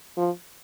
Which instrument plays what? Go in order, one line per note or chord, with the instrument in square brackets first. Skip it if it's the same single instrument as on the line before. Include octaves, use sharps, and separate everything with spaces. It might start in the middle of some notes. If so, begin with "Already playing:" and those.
[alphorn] F3